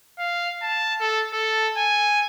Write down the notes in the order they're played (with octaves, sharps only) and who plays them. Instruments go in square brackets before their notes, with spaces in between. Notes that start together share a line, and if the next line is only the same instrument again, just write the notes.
[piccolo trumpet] F5
A5
A4
A4
G#5